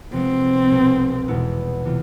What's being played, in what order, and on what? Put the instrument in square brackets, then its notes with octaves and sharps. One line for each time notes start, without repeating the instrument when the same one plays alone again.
[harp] C3 F3 G#3 B3 [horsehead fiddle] C4
[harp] C2 B2 B3
E2 B2 G#3 B3 E4
C3 E3 B3 F4